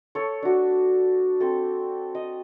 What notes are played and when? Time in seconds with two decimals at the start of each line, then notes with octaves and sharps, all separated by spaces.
0.15 A4 C#5
0.43 D4 F#4
1.40 C4 A4
2.15 D#5